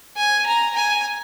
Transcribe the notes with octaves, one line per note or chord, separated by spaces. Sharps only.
G#5
A#5
G#5